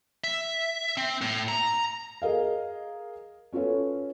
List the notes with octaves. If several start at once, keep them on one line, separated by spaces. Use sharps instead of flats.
E5
C4
A2
A#5
G#4 A#4 D#5 F5
C#4 F4 A4 B4 C#5